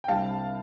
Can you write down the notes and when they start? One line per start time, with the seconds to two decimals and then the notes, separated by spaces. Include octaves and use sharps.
0.04 G5
0.08 C2 C3 G3 D4 F5 A5